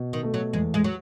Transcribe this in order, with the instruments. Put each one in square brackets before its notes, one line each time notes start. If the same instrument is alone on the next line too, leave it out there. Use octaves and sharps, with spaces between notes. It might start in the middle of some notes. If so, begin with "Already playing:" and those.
Already playing: [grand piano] B2
[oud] D#3
[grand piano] A3
[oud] F#3
[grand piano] E2 [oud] G#3
[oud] G#3
F#3